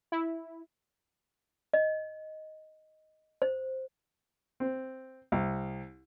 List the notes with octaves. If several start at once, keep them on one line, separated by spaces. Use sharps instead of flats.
E4
D#5
C5
C4
C2